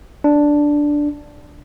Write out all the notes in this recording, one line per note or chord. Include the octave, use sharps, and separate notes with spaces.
D4